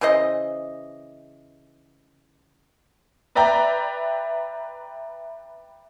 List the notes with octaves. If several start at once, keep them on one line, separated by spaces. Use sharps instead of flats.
C#3 E3 C5 D#5
B4 D5 E5 G5 A#5